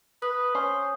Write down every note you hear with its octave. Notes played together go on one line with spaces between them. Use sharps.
B4 D#6
C#4 C5